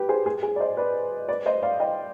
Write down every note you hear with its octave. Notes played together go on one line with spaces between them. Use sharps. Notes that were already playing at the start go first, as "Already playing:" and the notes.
Already playing: G4 B4
G#4 C5
G#4
G#4
D5
C5 D#5
B4 D5
B4 D5
C5 D#5
D5 F5
D#5 G5